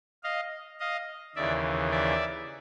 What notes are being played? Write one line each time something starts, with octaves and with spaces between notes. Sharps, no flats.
D#5 F5
D#5 F5
D#2 C#3 E3 D5 E5
D5 E5